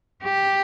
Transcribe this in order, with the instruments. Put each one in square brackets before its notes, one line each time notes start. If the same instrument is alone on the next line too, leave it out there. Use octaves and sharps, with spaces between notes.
[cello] G4